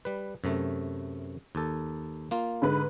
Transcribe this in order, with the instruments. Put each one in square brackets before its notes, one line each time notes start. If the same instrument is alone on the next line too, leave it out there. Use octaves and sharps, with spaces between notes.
[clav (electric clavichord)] G3 B4
F#2 C3 A3
D#2 A4
A#3 F4
[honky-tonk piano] G#2 D3 B4